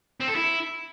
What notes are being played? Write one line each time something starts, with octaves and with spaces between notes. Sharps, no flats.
C4
A4
E4